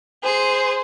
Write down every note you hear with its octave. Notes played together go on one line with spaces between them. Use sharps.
G#4 C5 C6